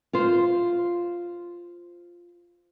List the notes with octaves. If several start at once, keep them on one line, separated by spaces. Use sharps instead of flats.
F4 C5